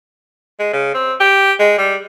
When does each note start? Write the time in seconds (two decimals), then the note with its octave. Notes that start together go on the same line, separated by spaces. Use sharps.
0.60 G#3
0.73 C#3
0.94 C4
1.20 G4
1.60 G#3
1.78 G3